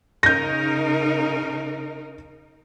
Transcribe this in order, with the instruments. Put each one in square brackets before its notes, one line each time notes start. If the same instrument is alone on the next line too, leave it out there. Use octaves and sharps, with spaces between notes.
[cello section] C#3 D#4 A#4 [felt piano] G6 A#6